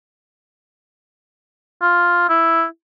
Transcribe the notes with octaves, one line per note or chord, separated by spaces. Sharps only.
F4
E4